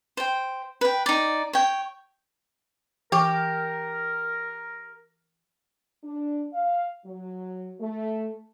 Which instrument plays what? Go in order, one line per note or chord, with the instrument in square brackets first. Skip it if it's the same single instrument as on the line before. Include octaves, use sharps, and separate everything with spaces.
[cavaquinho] C5 G5
B4 G5
D#4 D5
C#5 G5
[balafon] E3 C#6 [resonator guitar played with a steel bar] G4 [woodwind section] A#4
[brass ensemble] D4
F5
F#3
A3